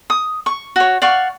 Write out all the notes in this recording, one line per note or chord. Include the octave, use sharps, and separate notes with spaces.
D#6
C#6
F#4 C#5
D5 F5 F#5 C#6